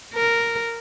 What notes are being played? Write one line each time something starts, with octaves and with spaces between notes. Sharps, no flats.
A#4